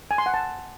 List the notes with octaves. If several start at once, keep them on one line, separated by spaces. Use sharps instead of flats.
G#5
C6
F#5
A5